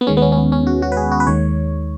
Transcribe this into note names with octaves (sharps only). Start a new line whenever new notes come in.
B3
D#2 D#3 G#3 C#4
B3
C#4
C#4
B3
C#4
F#4
F#4
B4
G#4
F#4
B4
D#2 D#3 G#3 C#5